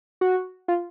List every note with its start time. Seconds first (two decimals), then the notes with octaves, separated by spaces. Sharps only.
0.21 F#4
0.68 F4